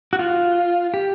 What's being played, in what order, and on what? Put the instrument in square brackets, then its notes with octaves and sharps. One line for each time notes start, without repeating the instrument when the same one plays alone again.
[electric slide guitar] F#4
F4
G4